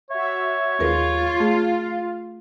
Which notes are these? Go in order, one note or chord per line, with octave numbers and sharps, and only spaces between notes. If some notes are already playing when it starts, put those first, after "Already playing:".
F#4 C#5 E5
D#2 F4 G#4 A#4 B4
A3 G#4 F5